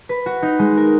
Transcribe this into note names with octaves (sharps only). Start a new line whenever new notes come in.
B4
F#4
D#4
G#3
A#4